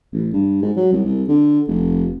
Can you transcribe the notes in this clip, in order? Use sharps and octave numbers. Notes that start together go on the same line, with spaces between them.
A1
G2
G#2
F#3
C2
C2
D3
F1